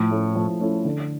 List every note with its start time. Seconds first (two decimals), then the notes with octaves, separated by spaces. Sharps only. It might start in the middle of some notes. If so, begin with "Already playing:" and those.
Already playing: A2 F3
0.11 A3 C#4 E4
0.35 F3
0.60 A3 C#4 E4
0.85 D3